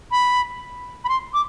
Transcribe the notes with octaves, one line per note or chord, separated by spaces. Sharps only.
B5
B5
C6
D6